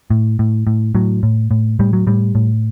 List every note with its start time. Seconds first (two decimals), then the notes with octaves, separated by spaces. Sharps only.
0.10 A2
0.39 A2
0.67 A2
0.95 A2 F#3
1.23 A2
1.51 A2
1.79 A2 G3
1.93 F#3
2.07 A2 G3
2.35 A2